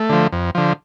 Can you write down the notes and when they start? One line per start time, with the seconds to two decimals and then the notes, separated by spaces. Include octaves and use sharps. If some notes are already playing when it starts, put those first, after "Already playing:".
Already playing: A3
0.09 D3 F3
0.32 F2
0.55 D3 F3